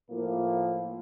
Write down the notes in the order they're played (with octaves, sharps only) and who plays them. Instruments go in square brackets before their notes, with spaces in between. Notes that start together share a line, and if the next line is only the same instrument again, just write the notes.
[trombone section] A2 F3 A#3